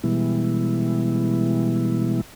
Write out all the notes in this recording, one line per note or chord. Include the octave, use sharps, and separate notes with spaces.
B2 E3 G3 G#3 B3 E4